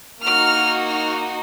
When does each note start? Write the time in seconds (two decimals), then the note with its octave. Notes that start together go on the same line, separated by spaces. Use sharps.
0.23 A#3 D#4 F#4 F6
0.88 F6